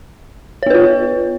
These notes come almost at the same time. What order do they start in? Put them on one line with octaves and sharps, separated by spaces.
C#5 B3 B4 F4